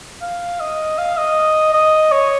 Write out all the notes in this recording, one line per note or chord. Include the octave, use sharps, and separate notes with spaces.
F5
D#5
F5
D#5
D#5
C#5